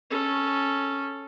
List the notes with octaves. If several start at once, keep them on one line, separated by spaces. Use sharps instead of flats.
C#4 A4